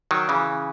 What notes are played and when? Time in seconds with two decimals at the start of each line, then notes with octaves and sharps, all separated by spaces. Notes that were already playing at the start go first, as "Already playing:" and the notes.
0.11 D#3 F#3
0.29 C#3 E3